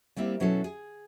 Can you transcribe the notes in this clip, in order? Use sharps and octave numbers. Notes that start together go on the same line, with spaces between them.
G3 A#3 C4 E4
B2 F#3 C#4 E4 G#4 A4
G#4